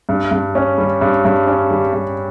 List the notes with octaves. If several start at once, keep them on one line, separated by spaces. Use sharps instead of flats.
G2
G2
C#4
G3
G2
G2
C#4
G3
G2